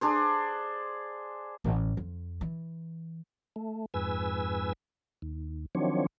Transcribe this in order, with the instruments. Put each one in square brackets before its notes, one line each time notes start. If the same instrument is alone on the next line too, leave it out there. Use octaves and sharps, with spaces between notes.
[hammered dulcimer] D4 G#4 C5
[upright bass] A1
F2
E3
[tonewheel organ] A3
F2 G#2 B4 G#5 E6
D#2
D#3 F3 F#3 C4 D4 C#5